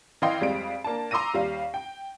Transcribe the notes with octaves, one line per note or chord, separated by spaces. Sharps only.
E3 D5 D#5 F5 G5 C6
F2 G3 G#3 F5 D7
A#3 D4 A5
A#5 C6 D6 E6 A#6 D#7
D#2 G3 F5
G5